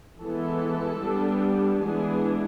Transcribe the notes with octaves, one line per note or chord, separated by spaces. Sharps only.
E3 G#3 B3 A4
G3 B3 D4
E3 G#3 B3 D4 G#4